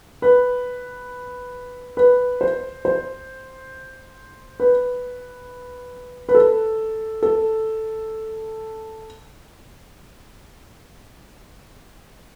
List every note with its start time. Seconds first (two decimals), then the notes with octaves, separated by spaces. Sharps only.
0.22 B4
1.97 B4
2.41 C5
2.85 C5
4.60 B4
6.29 B4
6.35 A4
7.23 A4